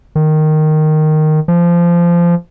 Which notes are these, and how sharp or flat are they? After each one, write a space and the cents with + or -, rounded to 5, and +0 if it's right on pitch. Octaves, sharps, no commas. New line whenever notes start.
D#3 -10
F3 -20